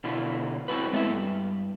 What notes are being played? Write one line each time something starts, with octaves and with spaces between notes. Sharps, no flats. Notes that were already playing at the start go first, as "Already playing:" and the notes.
B2 D3 E4 F4
C4 E4 F#4 B4
G#3 A3 B3 D4 E4 E5
G2